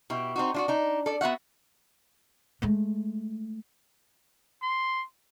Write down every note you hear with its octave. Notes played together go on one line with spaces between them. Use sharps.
B2 E4 G4
C4 D#4 F#4
D4 F4 F#4
D4 D#4
A4 D5
B3 F#4 E5 F#5
G#3 A3
C6